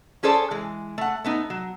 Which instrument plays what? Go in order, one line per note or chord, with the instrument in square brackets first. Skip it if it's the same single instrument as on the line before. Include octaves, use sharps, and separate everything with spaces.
[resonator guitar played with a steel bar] C#4 G#4 A4 C5 D5
E3 G#3
A3 F#5
A3 B3 D#4
F#3